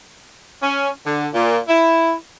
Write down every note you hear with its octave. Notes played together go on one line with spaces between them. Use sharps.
C#4
D3
A#2
E4